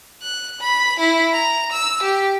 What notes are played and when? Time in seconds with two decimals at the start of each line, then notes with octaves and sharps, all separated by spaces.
0.22 F#6
0.61 B5
0.99 E4
1.33 A#5
1.72 E6
2.03 G4